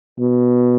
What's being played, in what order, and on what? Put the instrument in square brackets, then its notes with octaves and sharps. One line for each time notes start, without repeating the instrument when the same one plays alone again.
[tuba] B2